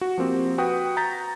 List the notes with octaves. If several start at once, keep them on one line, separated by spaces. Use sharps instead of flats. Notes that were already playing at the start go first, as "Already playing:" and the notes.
F#4
F3 A#3 C4 G4
F#4 B4 G5 D#6
A#5 G6 A6 B6